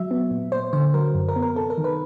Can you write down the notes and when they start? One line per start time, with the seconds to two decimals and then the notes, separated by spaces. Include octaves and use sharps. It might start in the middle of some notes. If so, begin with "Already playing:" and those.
Already playing: F#3 E5
0.11 B3
0.31 A#2
0.52 A#2 C5
0.73 D3 C5
0.94 F#3 A#4
1.14 F#2
1.28 A#4
1.36 B3
1.43 A#4
1.56 C3 A4
1.70 A#4
1.78 D#3
1.84 B4